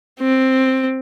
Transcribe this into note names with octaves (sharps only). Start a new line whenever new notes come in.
C4